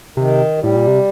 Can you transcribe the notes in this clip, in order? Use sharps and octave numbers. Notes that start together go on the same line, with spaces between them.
C3 D#3
G3
A2
A#2
C3